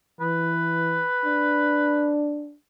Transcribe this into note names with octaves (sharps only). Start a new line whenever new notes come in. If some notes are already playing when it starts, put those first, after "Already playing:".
E3 B4
D4